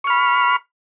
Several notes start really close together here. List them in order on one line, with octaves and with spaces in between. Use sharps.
C#6 F6 B5